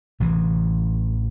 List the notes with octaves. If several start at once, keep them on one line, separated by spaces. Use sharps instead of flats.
A1 C3 E3